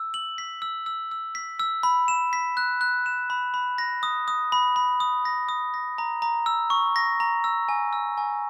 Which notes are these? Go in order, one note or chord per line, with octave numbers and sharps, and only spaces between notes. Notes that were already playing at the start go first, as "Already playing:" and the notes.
Already playing: E6
F#7
B6
E6
E6
E6
B6
E6
B5
E7
B6
F#6
F#6
E7
B5
B5
A#6
D#6
D#6
B5
B5
D#6
A#6
D#6
A#6
A#5
A#5
E6
C#6
A#6
A#5
E6
G#5
E6
G#5